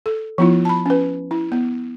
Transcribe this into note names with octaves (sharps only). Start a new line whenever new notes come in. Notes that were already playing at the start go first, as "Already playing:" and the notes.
A4
F3 B3 E4 F4
A5 B5
C#4 B4
E4
B3